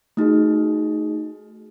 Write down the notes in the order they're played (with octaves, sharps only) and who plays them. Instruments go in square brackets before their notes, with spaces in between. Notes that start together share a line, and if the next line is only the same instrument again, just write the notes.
[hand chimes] A3 D#4 F#4 G#4